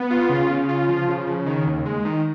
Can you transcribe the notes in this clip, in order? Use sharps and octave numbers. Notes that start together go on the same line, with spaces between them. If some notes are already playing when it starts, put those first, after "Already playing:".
Already playing: B3
F4
C#3
C#3
F4
F3
C#3
C#3
D#3
D#2
G#3
D#3